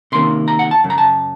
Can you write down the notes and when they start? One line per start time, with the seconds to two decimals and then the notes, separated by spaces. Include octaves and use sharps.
0.12 C3 D#3 A#3 C#4 C6
0.48 A#5
0.59 F#5
0.71 A5
0.84 F#2 C#3
0.90 A#5
0.98 A5